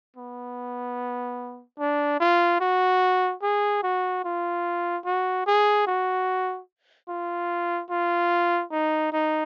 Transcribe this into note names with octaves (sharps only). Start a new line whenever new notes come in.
B3
D4
F4
F#4
G#4
F#4
F4
F#4
G#4
F#4
F4
F4
D#4
D#4